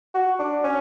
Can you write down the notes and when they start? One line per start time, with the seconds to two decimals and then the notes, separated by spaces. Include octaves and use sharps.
0.15 F#4
0.39 D4
0.64 C#4